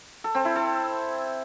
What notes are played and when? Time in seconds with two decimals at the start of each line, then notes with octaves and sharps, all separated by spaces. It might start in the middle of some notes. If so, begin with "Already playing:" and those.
0.24 A4
0.35 C4
0.45 E4
0.55 A4